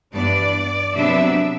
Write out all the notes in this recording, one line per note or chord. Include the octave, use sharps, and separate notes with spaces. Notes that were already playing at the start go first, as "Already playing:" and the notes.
G2 E3 B3 D4 D5
C3 F#3 B3 D4 E5